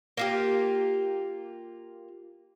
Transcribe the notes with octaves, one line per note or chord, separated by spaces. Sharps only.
A#3 F4 G4